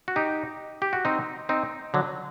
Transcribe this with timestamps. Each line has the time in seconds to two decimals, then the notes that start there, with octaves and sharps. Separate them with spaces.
0.08 F#4
0.16 D#4 G4
0.82 G4
0.93 F#4
1.05 C4 D#4
1.49 C4 D#4
1.94 D3 F#3